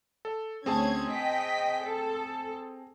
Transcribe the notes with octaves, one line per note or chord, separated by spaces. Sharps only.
A4
D2 C4 C#4 G#4 A5 G#6
D#5 G5 B6
A4